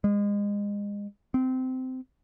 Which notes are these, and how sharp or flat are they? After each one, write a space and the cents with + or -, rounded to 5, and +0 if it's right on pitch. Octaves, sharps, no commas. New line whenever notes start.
G#3 -30
C4 -20